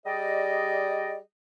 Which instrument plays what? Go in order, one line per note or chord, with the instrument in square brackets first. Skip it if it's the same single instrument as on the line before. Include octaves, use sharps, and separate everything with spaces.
[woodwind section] G3 G4 G#4 D5 D#5